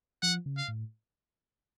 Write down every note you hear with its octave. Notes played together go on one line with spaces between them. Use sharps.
F3 F#5
C#3
F5
A2